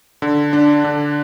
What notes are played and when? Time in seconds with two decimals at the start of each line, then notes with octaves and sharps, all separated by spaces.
0.22 D3
0.53 D4
0.84 D3